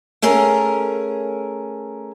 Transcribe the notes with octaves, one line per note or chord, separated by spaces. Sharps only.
A3 C#4 G#4 A#4